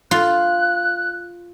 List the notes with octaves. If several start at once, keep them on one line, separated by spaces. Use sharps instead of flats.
F4 F#6